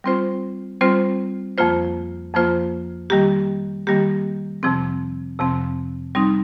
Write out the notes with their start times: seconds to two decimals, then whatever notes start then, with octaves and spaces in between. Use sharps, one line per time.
0.04 G3 C4 F4 C5
0.81 G3 C4 F4 C5
1.58 F2 F3 A#3 F4 C5
2.34 F2 F3 A#3 F4 C5
3.10 D#3 G3 A#3 G4
3.87 D#3 G3 A#3 G4
4.63 F2 C3 F3 C4
5.39 F2 C3 F3 C4
6.15 G3 C4 D#4